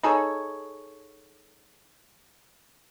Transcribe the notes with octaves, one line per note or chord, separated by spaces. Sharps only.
D#4 G#4 A4 C#5